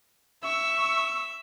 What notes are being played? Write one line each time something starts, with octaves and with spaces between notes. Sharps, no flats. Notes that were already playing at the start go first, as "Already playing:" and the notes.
E5 C#6 E6